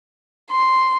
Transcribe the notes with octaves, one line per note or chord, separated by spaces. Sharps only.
C6